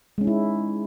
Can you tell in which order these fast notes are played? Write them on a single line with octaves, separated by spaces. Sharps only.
G#3 C#4 D#4 E4